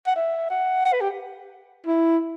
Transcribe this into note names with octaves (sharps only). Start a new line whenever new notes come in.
F#5
E5
F#5
F#5
B4
G4
E4